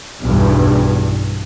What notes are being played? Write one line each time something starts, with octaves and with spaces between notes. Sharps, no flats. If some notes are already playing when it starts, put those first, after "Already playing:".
B1 E2 G2